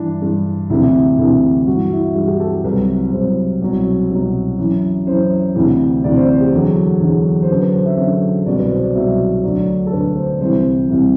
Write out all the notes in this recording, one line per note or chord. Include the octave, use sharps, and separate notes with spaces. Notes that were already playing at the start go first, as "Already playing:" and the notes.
Already playing: G2 E3 D4
G2 E3
D2 C3 E3 E4
D2 C3 E3
G2 E3 F#4
E4
G2 E3 F#4
G4
A4
A4
C2 C3 F#3 B4
C2 C3 F#3 C5
C2 B2 F#3
C2 B2 F#3
F#2 E3
F#2 E3 C5
D2 C3 E3
D2 C3 E3 D5
C5
C5
G4
E2 D3 F#3
E2 D3 F#3
C5
F#2 D3 F#3 B4
B4
C5
E5
F#2 D3 F#3
C2 B2 F#3 D5
B4
C5
D5
C2 B2 F#3 E5
D2 D3 F#3 D5
A4
D2 D3 F#3 B4
C5
C2 C3 E3 C5
C2 C3 E3